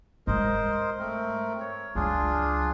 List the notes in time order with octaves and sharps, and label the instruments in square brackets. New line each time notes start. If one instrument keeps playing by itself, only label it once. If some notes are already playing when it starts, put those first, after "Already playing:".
[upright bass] G#2 G#3 [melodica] A#4 C5 D#5
[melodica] A3 C4 A#4
C#5
[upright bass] C#2 F#3 [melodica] D4 F4 G#4